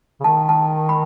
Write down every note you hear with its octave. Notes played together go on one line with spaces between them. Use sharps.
C#3
D#3 A5
A5
B5